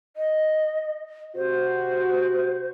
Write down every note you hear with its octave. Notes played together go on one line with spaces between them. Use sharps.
D#5
C3 F#4 C5